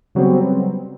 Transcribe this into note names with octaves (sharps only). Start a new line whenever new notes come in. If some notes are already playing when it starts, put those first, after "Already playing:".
C#3 F#3 G3 B3 C4